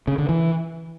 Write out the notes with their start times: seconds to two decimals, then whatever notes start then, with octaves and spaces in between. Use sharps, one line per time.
0.08 C#3
0.18 D3
0.29 E3